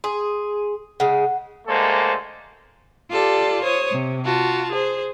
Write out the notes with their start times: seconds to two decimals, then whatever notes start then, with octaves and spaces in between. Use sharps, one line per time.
0.04 G#4 C6
1.00 C#3 G#3 F#5
1.67 D2 G#3 A#3 A4 C5
3.11 F4 G4 A4 D5
3.63 C5 C#5 D#6
3.91 C3
4.25 F4 F#4 A5
4.71 G#4 C5